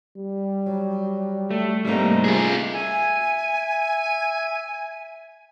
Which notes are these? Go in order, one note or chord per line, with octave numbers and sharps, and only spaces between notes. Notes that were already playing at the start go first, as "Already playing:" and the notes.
G3
F#3
A3
G#2 C3 G3 A3 A#3 D#4
F4 G#4
E5 G#5